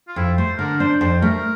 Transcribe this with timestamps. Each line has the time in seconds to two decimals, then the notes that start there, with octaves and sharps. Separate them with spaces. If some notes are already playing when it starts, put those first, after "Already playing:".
0.08 F4
0.16 F2 E4
0.37 A3 C5
0.58 D3 A#4
0.79 D4 C5
1.00 F2 C5
1.22 A3 A#4